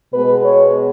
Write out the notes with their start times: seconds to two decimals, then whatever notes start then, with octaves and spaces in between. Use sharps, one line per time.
0.12 B2 G#3 B3 B4
0.44 C#5